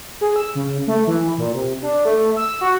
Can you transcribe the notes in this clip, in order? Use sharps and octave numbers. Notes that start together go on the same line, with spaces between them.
G#4
E6
C#3
A3
E3
A#2
C3
D4
A3
E6
F#4